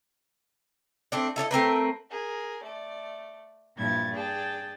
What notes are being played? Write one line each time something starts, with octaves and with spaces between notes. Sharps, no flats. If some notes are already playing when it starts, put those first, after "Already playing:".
A3 C4 D4
E4 A4 C#5 D#5
A3 C4 A#4 B4
G#4 A#4
A3 D5
G2 A#2 F3 E4 G#6 A6
G#4 D5 G5 A5 A6